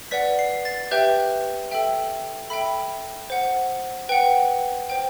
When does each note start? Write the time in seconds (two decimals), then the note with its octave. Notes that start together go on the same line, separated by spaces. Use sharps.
0.11 B4 D5 F#5 B6
0.39 C7
0.65 A6
0.91 G4 B4 E5 G5 G6
1.71 A4 E5 G5
2.50 A4 E5 G5 B5
3.30 C5 F#5
4.09 B4 F#5 G5
4.90 C5 G5